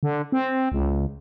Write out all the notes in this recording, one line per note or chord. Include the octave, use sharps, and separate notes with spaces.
D3
C4
C#2